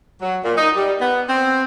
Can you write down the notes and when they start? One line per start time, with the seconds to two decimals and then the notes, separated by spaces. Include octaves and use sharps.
0.21 F#3
0.44 A#2
0.57 D#4
0.75 G3
1.01 B3
1.29 C4